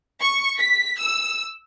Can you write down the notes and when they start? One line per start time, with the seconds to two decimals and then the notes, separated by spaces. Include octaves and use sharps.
0.20 C#6
0.59 B6
1.00 E6